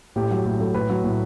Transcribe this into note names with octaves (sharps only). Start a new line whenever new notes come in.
A2 G4
F#3
A2 G4
F#3 A4
A2 B4
F#3
A2